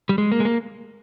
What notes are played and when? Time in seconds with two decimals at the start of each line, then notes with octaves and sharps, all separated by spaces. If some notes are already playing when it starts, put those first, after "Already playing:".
0.09 G3
0.18 G#3
0.32 A#3
0.40 G#3
0.45 A#3